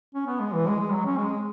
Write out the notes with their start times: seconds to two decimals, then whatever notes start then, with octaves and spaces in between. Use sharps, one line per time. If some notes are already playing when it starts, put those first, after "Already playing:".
0.15 C#4
0.27 B3
0.40 G#3
0.54 E3
0.67 G#3
0.80 G#3
0.92 F#3
1.06 C#4
1.18 G#3